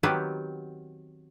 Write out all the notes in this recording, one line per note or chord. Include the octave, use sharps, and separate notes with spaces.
D#3 F#3 B3 C4 G4 B4